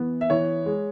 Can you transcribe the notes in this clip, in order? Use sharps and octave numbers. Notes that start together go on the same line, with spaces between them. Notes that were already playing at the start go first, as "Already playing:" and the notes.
Already playing: E3 B3
E5
E3 C#5
G#3